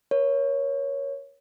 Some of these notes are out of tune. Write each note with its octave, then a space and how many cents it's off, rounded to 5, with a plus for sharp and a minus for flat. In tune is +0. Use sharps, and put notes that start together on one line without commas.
A#4 +35 C#5 +0